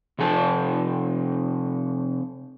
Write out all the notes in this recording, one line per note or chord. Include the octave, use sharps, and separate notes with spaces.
C3 F3 A4 A5